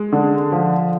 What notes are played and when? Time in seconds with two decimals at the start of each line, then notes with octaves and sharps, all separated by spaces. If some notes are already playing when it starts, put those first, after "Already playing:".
Already playing: G#3
0.13 D3
0.52 F3